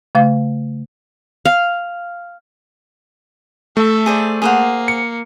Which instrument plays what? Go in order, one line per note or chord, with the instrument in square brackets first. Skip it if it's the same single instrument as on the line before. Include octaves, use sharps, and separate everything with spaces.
[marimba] C#3 A3 F5
[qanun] F5
[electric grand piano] A3 [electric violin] A4 E5
[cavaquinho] G#4 C5 D5
[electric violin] A#3 [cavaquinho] G#4 C5 F#5
[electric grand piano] C#7